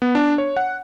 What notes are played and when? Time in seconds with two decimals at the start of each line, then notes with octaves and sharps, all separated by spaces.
0.02 B3
0.15 D4
0.38 C#5
0.57 F#5